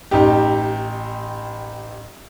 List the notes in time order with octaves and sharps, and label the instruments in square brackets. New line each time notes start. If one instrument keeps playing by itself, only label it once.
[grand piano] A1 D#4 G4